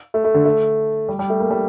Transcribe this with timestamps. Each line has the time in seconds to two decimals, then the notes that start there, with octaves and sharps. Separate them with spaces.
0.14 A3
0.24 A3
0.34 D3
0.45 A3
1.08 G3
1.19 G3
1.30 A3
1.40 A#3
1.51 G3